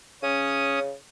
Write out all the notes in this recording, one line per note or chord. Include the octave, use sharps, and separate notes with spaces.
C#3 C#4 D#6